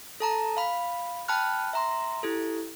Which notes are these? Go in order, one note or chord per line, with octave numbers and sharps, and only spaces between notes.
A4 A5 A#5
F5 B5
G5 A5 B5 F6 F#6
E5 A#5 C6
E4 G4 A4